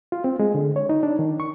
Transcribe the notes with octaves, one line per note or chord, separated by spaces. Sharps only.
F4
C4
G#3
D3
C#5
D#4
D4
D#3
C#6